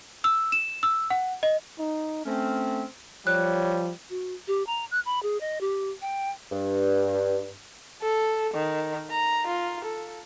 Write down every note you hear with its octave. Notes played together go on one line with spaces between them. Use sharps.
E6
E7
E6
F#5
D#5
D#4
A3 C4 C#4
F3 G3 C#5 F#6
F#4
G4
A#5
F#6
B5
G#4
D#5
G4
G5
G2
A4
D#3
A#5
F4
A4